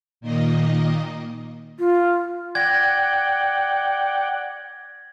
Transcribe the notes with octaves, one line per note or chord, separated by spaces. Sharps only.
A#2 D#3 A#3 D#5
F4
D5 F#5 G5 G#6 A#6